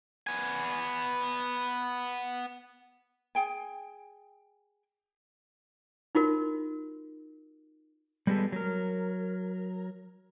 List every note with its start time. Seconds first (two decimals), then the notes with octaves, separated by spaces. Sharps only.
0.27 B3 G#5
3.35 G#4 G5 G#5
6.15 D#4 F4 F#4 A#4
8.27 G3 G#3 B3 G4 A4
8.52 F#3 A#4